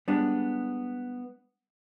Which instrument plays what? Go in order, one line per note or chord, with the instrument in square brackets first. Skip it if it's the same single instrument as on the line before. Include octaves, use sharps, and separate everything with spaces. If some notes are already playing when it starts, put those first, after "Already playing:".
[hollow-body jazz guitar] G3 G#3 B3 D4